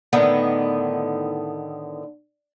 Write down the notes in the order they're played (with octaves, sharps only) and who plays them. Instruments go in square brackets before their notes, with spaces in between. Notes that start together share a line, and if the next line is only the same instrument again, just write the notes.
[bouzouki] A2 D3 D#3 B3